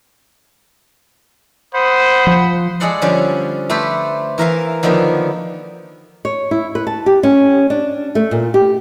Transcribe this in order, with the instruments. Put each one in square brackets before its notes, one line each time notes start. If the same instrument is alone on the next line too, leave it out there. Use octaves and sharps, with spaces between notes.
[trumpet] C5 [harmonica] F#5 B5 D#6
[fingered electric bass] F3
[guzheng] G#3 G#4 A4 D5 F#5 C6
D3 F3 G3 C#4 D5
A3 G4 A4 B4 C5
E3 A#4 E5 F5
D3 D#3 F3 A#3 B3
[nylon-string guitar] C#5
E4
B4
A5
G4
C#4
D4
A3
A#2
G4